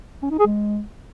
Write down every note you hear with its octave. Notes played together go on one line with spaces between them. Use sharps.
C#4
D#4
G#4
G#3